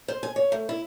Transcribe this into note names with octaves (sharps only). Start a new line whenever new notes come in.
C5
G#5
C#5
A3
E4